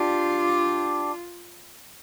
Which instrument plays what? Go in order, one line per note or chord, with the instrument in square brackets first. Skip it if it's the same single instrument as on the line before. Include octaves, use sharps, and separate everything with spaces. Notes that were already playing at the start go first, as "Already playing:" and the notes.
Already playing: [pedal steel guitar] D4 G4 [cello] F4